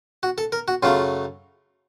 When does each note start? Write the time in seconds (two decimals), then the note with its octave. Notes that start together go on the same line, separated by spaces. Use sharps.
0.23 F#4
0.38 A4
0.52 A#4
0.68 F#4
0.83 F#2 C#3 F#3 A3 F4